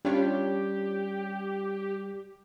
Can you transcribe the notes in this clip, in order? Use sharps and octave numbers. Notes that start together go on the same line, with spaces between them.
G3 C#4 D4 F4 G4 C#5 G5